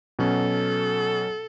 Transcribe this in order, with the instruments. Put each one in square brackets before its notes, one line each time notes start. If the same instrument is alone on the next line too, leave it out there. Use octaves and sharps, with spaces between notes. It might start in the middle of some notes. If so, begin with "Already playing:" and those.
[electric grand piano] B2 F#3 C#4 [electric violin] A4